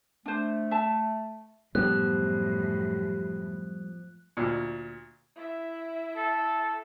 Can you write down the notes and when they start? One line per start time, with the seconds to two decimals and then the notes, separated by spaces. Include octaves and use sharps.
0.26 A3 D4 C5
0.71 E5 A5
1.75 F#2 A2 F3 G3 B3 F#6
4.37 D2 A#2
5.36 E4 E5
6.17 A4